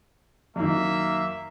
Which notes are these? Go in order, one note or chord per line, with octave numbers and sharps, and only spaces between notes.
F#2 D#3 A#3 E5